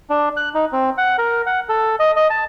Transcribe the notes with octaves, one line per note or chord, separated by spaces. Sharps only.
D4
F#6
D#4
C4
F#5
A#4
F#5
A4
D#5
D#5
A5